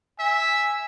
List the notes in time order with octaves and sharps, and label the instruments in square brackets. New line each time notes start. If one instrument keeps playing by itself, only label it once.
[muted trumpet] E5 [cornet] G#5